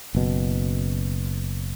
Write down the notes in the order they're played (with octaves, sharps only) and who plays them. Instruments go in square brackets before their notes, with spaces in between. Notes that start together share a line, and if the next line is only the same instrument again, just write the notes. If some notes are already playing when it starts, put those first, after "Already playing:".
[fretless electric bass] F#1 B2